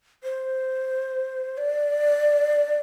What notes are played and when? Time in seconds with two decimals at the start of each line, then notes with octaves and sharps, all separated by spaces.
0.24 C5
1.58 D5